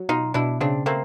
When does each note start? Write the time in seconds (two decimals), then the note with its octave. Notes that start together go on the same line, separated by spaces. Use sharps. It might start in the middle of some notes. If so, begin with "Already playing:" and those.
Already playing: F#3
0.09 B2 D#4 F4
0.34 B2 D4 E4
0.61 C#3 C4 D4
0.86 A3 A#3 C4